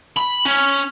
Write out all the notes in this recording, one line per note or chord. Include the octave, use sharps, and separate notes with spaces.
B5
C#4